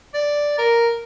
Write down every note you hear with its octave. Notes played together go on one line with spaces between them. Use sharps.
D5
A#4